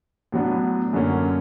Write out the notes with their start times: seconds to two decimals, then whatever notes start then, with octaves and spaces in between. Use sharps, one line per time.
0.32 A2 F#3 B3 D4
0.93 F#2 D3 F#3 A#3 C#4